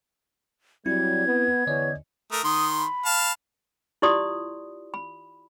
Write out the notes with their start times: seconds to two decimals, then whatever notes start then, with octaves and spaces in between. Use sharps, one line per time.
0.86 F#3 G3 C4 E4 G#6
1.27 B3
1.67 E2 D3 B3 C#4 D5 D#5
2.32 A3 A#4 D#6
2.44 D#3 C6 D#6
2.78 B5
3.05 F5 A5
4.02 E4 F4 G4 D5 C6 D#6
4.94 B5